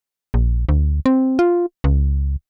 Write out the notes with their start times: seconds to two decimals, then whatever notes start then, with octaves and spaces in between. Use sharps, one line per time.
0.34 A#1
0.69 D2
1.06 C4
1.39 F4
1.84 C#2